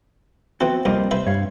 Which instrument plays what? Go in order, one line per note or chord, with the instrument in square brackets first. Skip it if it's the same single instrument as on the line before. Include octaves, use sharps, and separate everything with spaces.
[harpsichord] E3 A4 [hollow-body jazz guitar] B3 F#4 [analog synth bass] C4
[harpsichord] C2 F2 [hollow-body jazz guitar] G3 A#3 D#5
[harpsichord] C2 B4 E5 [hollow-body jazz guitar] C5
[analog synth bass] G2 [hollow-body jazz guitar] C#5 F5